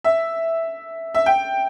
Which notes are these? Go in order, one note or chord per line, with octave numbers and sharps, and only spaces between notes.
E5
E5
G5